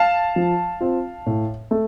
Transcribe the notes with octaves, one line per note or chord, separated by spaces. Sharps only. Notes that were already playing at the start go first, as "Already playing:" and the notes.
Already playing: F5 A5
F3
C4 F4
A2
A3